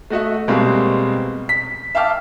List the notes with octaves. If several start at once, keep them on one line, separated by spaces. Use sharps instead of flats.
A3 F#4 D#5 E5
B2 G3 G#3 A#3 C4
B6
E5 F5 G5 A5 D6 F6